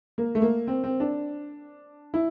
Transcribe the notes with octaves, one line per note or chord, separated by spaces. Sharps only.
A#3
A3
A#3
C4
C4
D4
E4